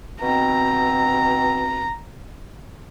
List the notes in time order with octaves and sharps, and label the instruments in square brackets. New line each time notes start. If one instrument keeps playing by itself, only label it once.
[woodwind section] B2 C4 [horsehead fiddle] A#5